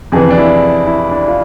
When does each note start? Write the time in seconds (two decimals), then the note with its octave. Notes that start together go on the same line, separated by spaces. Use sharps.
0.12 F2 C3 E3 G#4
0.31 D4
0.38 E4
0.87 E4
1.11 D4
1.28 F4